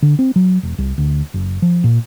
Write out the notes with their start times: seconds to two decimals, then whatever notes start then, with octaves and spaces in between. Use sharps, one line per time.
0.02 D3
0.19 C4
0.36 F#3
0.63 E1
0.78 C2
0.98 D2
1.34 F#1
1.62 F3
1.84 A#2